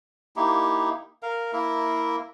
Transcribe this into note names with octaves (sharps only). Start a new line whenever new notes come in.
A#3 D#4 E4 G4
A#4 F5
A#3 E4 A#4 E5